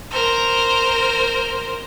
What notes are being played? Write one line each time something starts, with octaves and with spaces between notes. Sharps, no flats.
A#4 C5